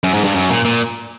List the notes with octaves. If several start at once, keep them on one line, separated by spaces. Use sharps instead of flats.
F#2
G#2
G2
F#2
A#2
A#2